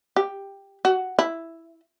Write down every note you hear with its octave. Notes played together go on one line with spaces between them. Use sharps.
G4
F#4
E4